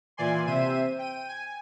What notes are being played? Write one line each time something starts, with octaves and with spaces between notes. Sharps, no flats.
A#2 E3 D5 G#5 C6
C3 C5 E5 D#7
G5 D#7
G#5